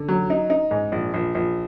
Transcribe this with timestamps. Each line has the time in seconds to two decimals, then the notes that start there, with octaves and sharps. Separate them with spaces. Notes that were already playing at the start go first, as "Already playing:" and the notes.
Already playing: D3
0.09 F#3
0.30 D#4
0.50 D#4
0.71 G#2
0.92 A#1
1.14 A#1
1.35 A#1